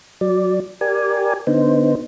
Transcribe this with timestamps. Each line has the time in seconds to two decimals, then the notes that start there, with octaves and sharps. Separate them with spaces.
0.21 F#3 D5
0.81 G4 A#4 D5 G#5
1.47 D3 B3 D#4 C5